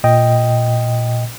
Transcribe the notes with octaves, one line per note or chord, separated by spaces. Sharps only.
A#2 D#5 G5